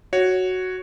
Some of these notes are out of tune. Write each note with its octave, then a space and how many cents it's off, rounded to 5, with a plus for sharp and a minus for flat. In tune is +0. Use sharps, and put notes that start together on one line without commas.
F#4 +0 C#5 +0